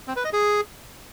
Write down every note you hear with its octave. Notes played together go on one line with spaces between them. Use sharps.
C4
B4
D#5
G#4